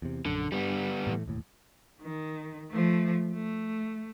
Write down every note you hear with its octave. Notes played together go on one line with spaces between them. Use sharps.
E2 C3
A#1 F#2 D3
G2 G3 B3
A2 E3 A3
E1 D#2 A2
D#3
F3 A3
A3